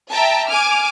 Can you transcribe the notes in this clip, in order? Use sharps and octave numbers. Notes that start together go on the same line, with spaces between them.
E5 G5 A5 A#5
G#5 D6 F6